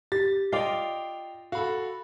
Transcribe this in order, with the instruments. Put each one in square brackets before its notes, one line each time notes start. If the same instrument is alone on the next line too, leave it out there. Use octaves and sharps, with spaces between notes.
[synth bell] G4 [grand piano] A6
[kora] F4 D5 [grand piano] D#5 G5 [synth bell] C7 F7
[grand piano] F#4 A4 [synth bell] F5 B5